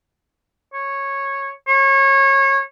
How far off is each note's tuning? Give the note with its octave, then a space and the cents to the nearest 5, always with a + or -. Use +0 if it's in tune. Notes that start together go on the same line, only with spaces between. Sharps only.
C#5 -10
C#5 -25